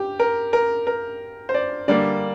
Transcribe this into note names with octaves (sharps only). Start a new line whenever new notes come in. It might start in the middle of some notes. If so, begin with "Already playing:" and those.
Already playing: G4
A#4
A#4
A#4
C5
D5
D3 G3 A#3 D5